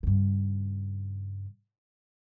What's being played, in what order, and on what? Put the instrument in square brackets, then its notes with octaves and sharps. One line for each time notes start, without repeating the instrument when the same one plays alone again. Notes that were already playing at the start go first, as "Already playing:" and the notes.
[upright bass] G2 C#3